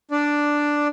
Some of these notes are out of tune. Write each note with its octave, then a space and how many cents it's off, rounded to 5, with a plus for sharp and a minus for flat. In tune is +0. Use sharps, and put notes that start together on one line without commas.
D4 +0 D5 +0